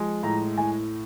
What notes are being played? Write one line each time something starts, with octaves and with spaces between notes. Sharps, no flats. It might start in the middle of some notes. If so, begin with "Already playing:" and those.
Already playing: F3 G#3
A2 A#5
A2 G#5